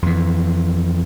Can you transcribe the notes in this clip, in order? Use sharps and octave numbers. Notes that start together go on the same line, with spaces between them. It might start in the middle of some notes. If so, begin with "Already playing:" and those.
F2 E3